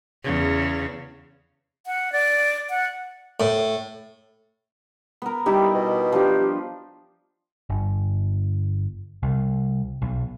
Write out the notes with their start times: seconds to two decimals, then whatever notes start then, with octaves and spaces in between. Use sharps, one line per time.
0.24 E2 C#3
1.86 F#5
2.13 D5
2.70 F#5
3.40 A2
5.22 B3 A#4
5.46 G3 D#4 E4 G4
5.74 B2
6.12 F3 D4 G4
7.70 G1
9.23 C2
10.02 B1